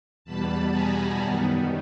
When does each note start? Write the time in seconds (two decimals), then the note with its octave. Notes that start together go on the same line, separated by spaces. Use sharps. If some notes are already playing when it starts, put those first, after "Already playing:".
0.25 E2 B2 G3 B3 A5 B5
0.71 G#5 A#5
1.16 F#2 D#3 G3 B3